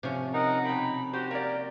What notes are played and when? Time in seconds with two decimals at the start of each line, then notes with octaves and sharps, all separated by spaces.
0.03 C3 F3 C#4
0.34 D#4 A#4 D#5 F#5
0.65 B2 G5 B5
1.13 F#4 G4 C5
1.31 A#3 A#4 D5